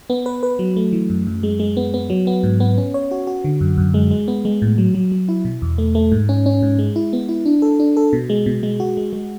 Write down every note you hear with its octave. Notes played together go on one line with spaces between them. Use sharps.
B3
B4
B4
F#3
A3
E3
F#2
F#2
G#3
G#3
B3
B3
F#3
B3
G#2
B3
C#4
C#5
F#4
F#4
D3
F#2
F#2
G#3
G#3
B3
G#3
A2
F#3
F#3
F#3
E4
B2
E2
A3
A3
G#2
C#4
C#4
G#2
G#3
E4
B3
E4
D4
A4
D4
A4
B2
G#3
B2
G#3
F#4
G#3
G#3